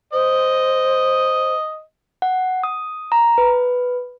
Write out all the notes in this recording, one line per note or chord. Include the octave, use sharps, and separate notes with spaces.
C5 D#5
F#5
D#6
A#5
B4